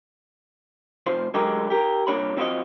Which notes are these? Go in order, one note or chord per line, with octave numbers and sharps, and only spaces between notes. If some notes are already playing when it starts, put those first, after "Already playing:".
C3 F3 C5
D3 F#3 G#3 G4 G#4 A#4
G4 A#4
C2 A#2 F#3 D4 C#5 B5
F3 C4 C#4 F4 F#4 D#5